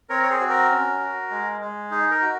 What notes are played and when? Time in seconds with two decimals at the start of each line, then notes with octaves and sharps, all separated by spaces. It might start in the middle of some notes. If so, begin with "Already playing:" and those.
0.09 C4 A#4 C#5
0.23 C#5
0.30 G#4 C5
0.40 F#4
0.49 A#4
0.70 C#4
1.00 F#4
1.30 G#3
1.61 G#3
1.91 D#4 G#4
2.11 A#4
2.22 F#4